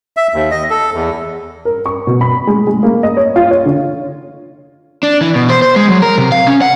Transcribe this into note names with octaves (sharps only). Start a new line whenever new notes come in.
E5
D#2
D#5
A4
E2
A#4
C#6
B2
B5
G#3
G#3
A#3
D#5
C#5
F4
C#5
D3
D4
E3
B2
C5
C5
G#3
F#3
A#4
C3
F5
C#4
F#5